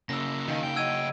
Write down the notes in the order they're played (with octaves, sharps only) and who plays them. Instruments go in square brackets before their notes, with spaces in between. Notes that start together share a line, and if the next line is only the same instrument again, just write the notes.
[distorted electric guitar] C#3 A#3 [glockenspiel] E6 A#6
[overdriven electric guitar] D#3 [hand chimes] D#4 F5
[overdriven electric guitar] G5
[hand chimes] D#5 F#5 [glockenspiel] E6 G#6 D#7